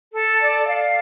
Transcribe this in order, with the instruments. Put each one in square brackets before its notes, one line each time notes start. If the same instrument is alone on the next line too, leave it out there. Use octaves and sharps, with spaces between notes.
[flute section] A4
D5
F5